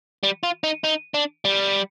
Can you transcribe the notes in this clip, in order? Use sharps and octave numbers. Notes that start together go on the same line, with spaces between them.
G3
F4
D#4
D#4
D4
G3